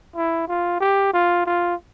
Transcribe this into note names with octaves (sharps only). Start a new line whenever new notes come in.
E4
F4
G4
F4
F4